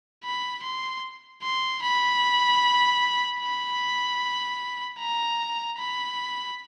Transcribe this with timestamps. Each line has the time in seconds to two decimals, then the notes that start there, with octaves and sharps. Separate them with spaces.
0.24 B5
0.64 C6
1.42 C6
1.82 B5
3.40 B5
4.99 A#5
5.78 B5